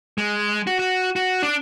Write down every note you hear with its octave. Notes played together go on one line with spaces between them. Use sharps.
G#3
F#4
F#4
F#4
D4